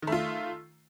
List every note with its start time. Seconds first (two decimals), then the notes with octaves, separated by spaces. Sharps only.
0.02 D#3
0.07 A3
0.12 F4